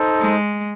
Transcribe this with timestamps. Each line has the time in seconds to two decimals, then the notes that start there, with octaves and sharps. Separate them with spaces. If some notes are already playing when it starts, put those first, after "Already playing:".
Already playing: D#4 A4 C5
0.20 G#3